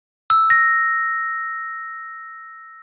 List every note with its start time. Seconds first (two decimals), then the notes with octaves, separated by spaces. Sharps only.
0.30 E6
0.50 A#6